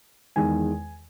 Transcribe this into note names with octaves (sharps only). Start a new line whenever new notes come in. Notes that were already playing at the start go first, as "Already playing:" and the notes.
E2 D#3 G#3 G#5